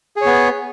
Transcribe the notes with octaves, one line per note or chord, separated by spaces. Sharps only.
B3 G#4 C#5